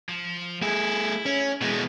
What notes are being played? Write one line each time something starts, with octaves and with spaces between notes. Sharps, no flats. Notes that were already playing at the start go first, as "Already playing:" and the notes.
F3
A3 E4 G#4
C#4
B2 E3 G#3 A3